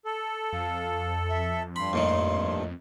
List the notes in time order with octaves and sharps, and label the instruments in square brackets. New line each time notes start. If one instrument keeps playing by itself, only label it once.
[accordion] A4
[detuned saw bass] F2 [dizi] F5
[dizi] E5
[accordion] G2 [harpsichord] B5 [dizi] C6
[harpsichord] D#2 A2 D#3